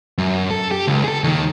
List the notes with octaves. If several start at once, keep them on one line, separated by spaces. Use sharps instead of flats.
F#2
A4
G4
C#2
G#4 A4
D#2 D#3